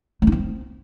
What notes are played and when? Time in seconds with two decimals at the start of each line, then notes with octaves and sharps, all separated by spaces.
0.22 A3
0.27 D#4
0.32 C4